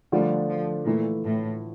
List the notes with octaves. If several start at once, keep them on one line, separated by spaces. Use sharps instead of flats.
D3 F3 G3 A3 D4 F4
F3
A#2 E3 A3 E4
A2